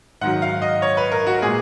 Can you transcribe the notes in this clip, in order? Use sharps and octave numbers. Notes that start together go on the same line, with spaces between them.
G#2 D#3 F#3 F#5
F5
D#5
C#5
B4
A#4
F#4
A#2 G#3 G#4